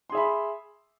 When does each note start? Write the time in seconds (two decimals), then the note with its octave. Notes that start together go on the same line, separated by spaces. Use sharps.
0.10 C6
0.12 G#4
0.15 E5
0.17 B5